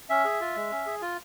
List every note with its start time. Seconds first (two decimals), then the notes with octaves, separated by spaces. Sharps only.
0.10 C#4 E5
0.25 G#4
0.40 F4
0.56 G#3
0.71 C#4
0.86 G#4
1.02 F4